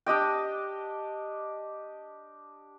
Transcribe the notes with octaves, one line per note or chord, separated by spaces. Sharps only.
D4 G4 D#5 G5